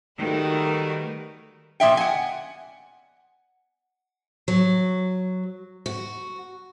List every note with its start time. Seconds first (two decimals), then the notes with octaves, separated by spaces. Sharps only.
0.19 D#3 G3 A3 F#4 A#4 B4
1.80 A#2 F3 E5 G5
1.97 F#5 G#5
4.48 F#3
5.86 F#4